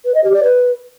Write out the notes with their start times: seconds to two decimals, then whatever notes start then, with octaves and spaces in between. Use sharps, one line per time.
0.05 B4
0.14 D#5
0.24 G4
0.33 D5
0.43 B4